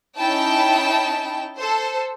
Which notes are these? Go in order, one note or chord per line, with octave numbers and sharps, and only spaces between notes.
C#4 D#4 E4 G5 A5
A4 C5